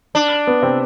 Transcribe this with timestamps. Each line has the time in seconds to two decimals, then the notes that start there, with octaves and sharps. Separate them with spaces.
0.15 D4
0.47 B3 B4
0.62 C3 C4